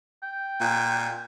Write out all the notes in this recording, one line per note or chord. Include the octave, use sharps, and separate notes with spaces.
G5
A#2